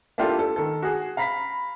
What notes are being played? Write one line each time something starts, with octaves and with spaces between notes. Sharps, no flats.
A#3 D4 E4 F4 G4 A4
A4
D#3 A4
F#4 G#4
F5 A#5 B5 B6